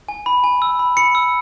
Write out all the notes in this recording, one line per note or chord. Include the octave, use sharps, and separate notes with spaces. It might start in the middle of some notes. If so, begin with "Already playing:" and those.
G#5
B5
G#5
E6
B5
B5 C#7
E6